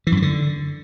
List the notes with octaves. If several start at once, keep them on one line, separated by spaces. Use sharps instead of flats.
E3
F#2
E3
D3